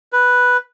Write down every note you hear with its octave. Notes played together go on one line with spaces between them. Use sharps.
B4